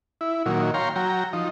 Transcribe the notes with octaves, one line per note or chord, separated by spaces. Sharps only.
E4
A#2 D#3 F#3
C#5 F5 G5 A#5 C6
F#3 G5 A#5
F3 D#4